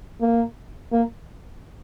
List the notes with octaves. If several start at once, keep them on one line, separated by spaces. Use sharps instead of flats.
A#3
A#3